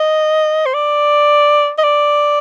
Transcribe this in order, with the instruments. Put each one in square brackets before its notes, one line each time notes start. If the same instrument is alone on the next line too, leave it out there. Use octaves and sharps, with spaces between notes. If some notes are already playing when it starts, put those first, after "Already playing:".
Already playing: [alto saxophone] D#5
C5
D5
D#5
D5